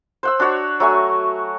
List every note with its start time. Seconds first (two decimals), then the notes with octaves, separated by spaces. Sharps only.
0.23 C5 F#5 E6
0.40 D4 F#4 C#5 F#5
0.80 F#3 A3 G#5 C#6